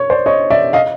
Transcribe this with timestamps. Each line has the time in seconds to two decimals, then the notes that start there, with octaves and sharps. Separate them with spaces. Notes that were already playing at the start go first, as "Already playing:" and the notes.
Already playing: C#5
0.10 C5 D5
0.26 C#5 D#5
0.50 D5 E5
0.73 D#5 F5